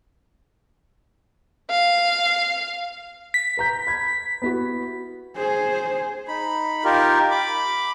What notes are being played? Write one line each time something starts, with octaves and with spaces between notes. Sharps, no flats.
F5
B6
B4 A#5 G6
B5 G#6
B3 E4 F#4
G#4 C5
D#4 B5
D#4 F4 G4 A#4
B5 D6